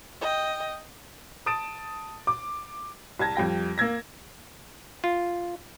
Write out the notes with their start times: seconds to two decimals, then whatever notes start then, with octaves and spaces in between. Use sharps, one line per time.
0.21 D#5 G5
1.46 A5 D#6 A6 D7 E7
2.27 D6
3.19 C2 A5 G#6 A#6
3.36 F2 G3 G5 A#6
3.78 A#3 E6 G#6 A#6
5.04 F4